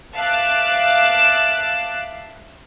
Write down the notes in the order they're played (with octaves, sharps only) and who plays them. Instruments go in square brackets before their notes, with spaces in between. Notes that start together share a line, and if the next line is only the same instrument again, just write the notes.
[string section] E5 F5 A5 D6 E6 F#6